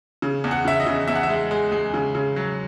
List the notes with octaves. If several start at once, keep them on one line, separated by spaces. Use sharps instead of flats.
C#3
E2
F#5
C#3 E5
D#5
C#3
E2 E5
F#5
E5
G#3
G#3
G#3
C#3
C#3
F#3